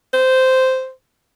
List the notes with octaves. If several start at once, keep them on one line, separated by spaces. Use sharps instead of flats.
C5